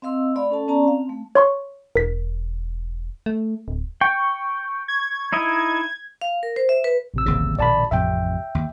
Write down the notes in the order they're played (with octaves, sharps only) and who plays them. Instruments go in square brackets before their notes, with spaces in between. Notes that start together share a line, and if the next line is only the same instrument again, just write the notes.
[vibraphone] C4 D#5 F5 C6 E6
A3 D5 F5 B5
C#4 A4 A5
B3 C#4 D5 A5 A#5
C4 F5
A3
[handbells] C#5 C6 C#6
[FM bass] E1 [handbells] A#4 B6
[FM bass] A3
D1
[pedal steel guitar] G5 [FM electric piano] C#6
[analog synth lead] G#6
[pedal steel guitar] D#4 E4 D#5
[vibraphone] F5
A#4
C5
E5
B4
[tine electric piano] A1 C3 E6
[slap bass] D1 D#2 C#3
[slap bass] A#1 B2 D#3 [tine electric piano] D5 A5 B5
[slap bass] A1 F2 C3 [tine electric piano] E5 G5
[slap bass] D#2